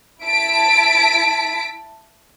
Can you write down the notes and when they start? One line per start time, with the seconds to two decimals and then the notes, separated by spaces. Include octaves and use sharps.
0.22 E4 A5 B6 D7